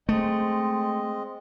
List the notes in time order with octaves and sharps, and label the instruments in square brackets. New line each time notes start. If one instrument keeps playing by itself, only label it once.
[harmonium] G#3 C4 D#5 [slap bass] A3